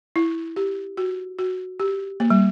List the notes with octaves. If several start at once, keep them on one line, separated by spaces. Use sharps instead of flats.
E4
G4
F#4
F#4
G4
A#3
G3